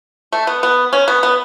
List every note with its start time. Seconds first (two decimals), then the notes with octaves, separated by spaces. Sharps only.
0.33 A3
0.47 B3
0.63 B3
0.93 C#4
1.08 B3
1.23 B3